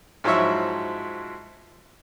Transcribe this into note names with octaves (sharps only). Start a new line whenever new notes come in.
G#2 F3 F#3 E4 C#5 E5